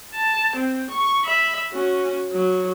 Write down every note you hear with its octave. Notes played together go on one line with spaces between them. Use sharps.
A5
C4
C#6
E5 B5
C#4 F#4
F#3